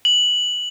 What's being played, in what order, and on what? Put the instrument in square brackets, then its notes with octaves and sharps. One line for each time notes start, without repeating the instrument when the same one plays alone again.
[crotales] F#7